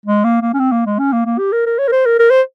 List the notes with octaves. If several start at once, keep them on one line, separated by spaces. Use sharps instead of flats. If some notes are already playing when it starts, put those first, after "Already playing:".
G#3
A#3
A#3
C#4
C4
A#3
G#3
C#4
A#3
A#3
G4
A#4
A#4
C#5
A#4
C5
A#4
A#4
C5